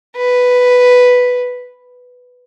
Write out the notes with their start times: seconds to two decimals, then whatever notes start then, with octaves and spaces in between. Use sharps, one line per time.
0.16 B4